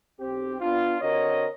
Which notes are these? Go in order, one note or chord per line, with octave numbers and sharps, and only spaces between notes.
B1 C4 G4
B3 D4 F4
D3 C4 F#4 A#4 C#5 D#5